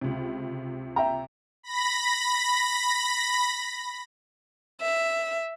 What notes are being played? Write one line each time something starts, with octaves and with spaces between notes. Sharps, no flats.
C#2 C3
E5 G5 A#5
B5 A#6
E5